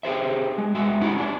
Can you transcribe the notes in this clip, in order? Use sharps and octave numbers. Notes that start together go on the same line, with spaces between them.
G4 G#4 C5 E5
G#3
G#3 F#4 E5
C#4 E4 F#4 G4
C#4 D4